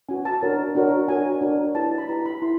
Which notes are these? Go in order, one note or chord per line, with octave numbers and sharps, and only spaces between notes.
C#4 F#4 B4 G#5
A5
D4 F#4 A#4 C#5
D4 F#4 A#4 C#5
D4 F#4 A#4 C#5 G#5
D4 F#4 A#4 C#5
E4 G4 B4 A5
B5
E4 G4 B4 A#5
B5
E4 C6